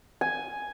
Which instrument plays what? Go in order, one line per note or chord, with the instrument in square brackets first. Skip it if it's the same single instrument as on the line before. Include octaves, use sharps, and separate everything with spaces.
[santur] G#5